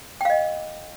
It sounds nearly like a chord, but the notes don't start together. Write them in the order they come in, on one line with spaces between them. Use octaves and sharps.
G5 F5 D#5